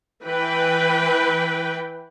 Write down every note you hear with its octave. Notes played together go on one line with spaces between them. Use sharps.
E3 B4 G5